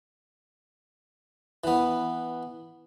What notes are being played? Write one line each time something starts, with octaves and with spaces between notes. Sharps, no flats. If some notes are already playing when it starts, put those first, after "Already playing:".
E3 B3